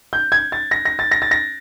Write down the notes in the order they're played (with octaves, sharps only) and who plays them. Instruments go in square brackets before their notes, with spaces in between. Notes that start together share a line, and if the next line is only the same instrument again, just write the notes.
[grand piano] G6
G#6
A6
A#6
A#6
A6
A#6
A6
A#6